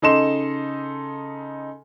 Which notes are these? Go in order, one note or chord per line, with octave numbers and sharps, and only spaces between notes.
C#3 D#4 A4 D#5 C6 E7